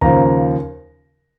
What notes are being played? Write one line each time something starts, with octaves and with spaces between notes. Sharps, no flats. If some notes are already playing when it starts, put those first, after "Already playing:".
D#2 C#3 F3 A#5